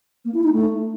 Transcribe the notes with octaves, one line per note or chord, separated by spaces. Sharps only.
A#3
E4
D#4
A3